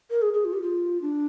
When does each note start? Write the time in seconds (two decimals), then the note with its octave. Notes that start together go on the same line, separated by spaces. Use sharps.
0.10 A#4
0.22 G#4
0.33 G#4
0.45 F4
0.53 G4
0.62 F4
1.02 D4